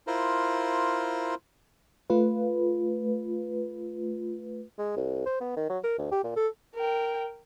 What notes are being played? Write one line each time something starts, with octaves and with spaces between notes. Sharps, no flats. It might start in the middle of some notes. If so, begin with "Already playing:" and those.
E4 F4 A#4 C5
A3 F4 B4
G#3
C2
C5
B3
D#3
F#3
A#4
D2
G4
A#2
A4
A#4 G5